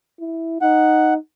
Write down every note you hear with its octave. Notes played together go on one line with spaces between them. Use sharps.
E4
D#4 F#5